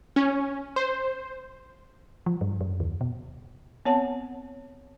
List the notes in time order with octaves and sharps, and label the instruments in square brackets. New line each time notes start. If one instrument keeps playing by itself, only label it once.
[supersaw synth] C#4
C5
[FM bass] F3
G2
F#2
D#2
B2
[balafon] B3 C4 C#5 F#5 A5